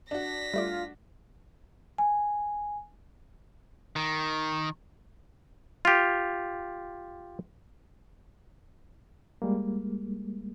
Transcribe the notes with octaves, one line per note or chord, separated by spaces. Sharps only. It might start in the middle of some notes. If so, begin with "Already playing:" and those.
D4 F#4 A#6 B6
G3 A3 F4 D5
G#5
D#3
F4 G4
G3 G#3 A#3